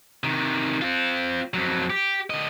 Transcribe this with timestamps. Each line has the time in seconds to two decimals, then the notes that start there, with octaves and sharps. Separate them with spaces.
0.24 C3 D#3
0.82 C4 F4
1.54 F2 F#3
1.90 G4
2.30 D3 D#5